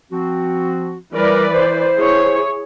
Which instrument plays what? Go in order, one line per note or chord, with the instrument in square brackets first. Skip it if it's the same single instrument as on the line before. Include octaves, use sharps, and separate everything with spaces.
[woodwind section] F3 C4 F#4
[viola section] E3 B4 D5 [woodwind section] G3 A#4
[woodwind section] C5
[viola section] E4 G#4 C#5